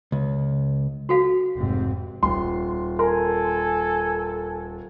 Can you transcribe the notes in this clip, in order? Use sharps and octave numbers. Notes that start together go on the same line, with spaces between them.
C#2
F#4 A4 F5
F1 G#2 C4
D#1 C6
A4 A#4 G#5 C6